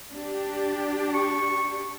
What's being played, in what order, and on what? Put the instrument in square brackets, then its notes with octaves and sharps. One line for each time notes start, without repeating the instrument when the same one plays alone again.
[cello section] D4 G4
[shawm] C#6